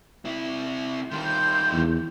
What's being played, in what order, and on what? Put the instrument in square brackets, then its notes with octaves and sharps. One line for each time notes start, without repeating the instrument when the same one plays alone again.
[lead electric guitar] C3 E4
[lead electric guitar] D#3 G3 [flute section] C6 G6
[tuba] E2